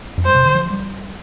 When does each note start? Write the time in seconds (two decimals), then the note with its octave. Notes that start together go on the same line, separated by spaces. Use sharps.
0.17 F2
0.25 G2 C5
0.35 C3
0.46 D3
0.55 F3
0.70 G3